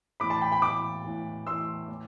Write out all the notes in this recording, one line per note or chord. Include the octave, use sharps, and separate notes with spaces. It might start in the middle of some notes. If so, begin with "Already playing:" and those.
A2 E3 B5 D6
A5 C6
G5 B5
G5 B5
A2 E3 B5 D6
A2 E3
A2 E3 C6 E6
A2